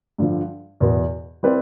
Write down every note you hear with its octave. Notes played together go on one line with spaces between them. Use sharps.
G2 D3 F3
E2 B2 B3
G3 C4 E4 B4 D5